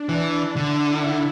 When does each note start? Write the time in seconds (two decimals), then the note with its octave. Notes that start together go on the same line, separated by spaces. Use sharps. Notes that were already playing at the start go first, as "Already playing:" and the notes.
Already playing: D4
0.09 E3
0.56 D3 E4